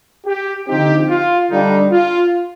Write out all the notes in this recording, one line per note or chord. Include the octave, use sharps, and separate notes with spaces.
G4
D3 F3 C4 D#4 G4
F4
D3 G3 D4 D#4
F4